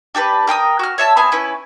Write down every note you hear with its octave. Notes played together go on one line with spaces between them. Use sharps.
D4 G4 A4 B4
A#4 G5 A#5 D#6
F#4 F6
C#5 E5 A5
B3 C4 E4 G#5
C#4 E4 B4